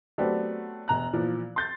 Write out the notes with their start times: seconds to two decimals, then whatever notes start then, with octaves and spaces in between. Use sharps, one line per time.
0.18 F#3 A3 B3 C4 D4 G4
0.88 E1 A#5 F#6
1.13 A#2 E3 F3
1.56 C6 G6 A6